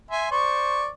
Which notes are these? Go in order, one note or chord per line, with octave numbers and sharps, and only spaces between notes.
E5 G#5 C6
C5 D5 C#6